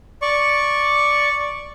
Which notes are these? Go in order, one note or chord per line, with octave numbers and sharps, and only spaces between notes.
D5 C#6